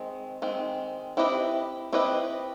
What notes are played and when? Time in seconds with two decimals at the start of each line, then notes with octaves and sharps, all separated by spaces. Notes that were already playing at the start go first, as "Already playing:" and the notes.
Already playing: D#3 G#3 C4
0.42 D#3 G#3 C4
1.17 C4 E4 G4 B4 D#5
1.92 C4 E4 G4 B4 D#5